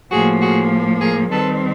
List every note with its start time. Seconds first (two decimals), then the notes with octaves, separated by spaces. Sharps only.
0.11 A2 F3 A#3 F#4 G#4
0.41 F#4 G#4
1.01 G#4 A#4
1.31 D#3 G3 C4 A4 B4